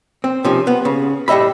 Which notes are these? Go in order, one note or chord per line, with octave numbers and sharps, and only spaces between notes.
C4
C3 D#3 F3 C#4
B3
C#3
A2 G3 D#5 E5 B5